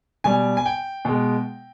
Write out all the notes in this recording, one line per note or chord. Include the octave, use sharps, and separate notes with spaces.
B2 G3 G#5
G#5
G5
B2 G#3